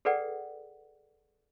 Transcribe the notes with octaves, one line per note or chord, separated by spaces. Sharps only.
G#4 A4 B4 D5 F#5 G5